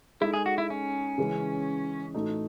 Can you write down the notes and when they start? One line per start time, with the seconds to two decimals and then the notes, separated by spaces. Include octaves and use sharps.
0.21 G#3 D#4 E4 A4
0.34 G#4
0.46 F#4
0.58 E4
0.70 C#4
1.18 C#3 E3 G#3
2.14 A2 E3 A3 D#4 F#4